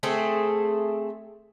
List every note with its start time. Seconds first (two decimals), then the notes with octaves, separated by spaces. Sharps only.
0.03 A3 C4 G#4 A4